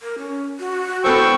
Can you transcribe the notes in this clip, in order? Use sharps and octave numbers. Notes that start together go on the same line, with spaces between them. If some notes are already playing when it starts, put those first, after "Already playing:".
A#4
C#4
F#4
B3 A4 C5 G5 C#6 E6